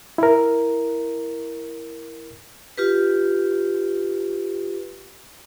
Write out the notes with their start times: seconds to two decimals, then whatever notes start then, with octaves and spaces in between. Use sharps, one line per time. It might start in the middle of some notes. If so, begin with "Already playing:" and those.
0.18 E4 A#4
2.78 F4 G4 B4